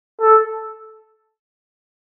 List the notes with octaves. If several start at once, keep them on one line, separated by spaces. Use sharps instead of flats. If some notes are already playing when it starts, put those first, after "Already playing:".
A4